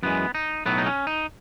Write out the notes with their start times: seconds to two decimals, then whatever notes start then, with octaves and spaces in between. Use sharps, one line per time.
0.03 F#2 E3 G#3 B3
0.35 D#4
0.66 B1 A2 F#3 B3
0.78 D#4
0.86 C#4
1.07 D#4